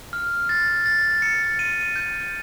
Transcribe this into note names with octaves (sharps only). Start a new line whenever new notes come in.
F6
A6
A6
C#7
D#7
G6